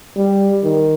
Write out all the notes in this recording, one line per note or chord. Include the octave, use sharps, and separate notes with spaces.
G3
D#3